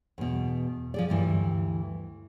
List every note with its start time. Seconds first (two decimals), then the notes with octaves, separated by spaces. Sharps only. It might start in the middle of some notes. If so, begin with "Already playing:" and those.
0.18 E2 B2
0.94 F3 G#4 D5
1.09 D2 G2 E3